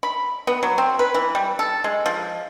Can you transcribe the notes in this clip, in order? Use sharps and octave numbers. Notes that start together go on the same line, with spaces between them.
B5
B3
F#3
C4
B4
E3
G3
A4
G#3
F3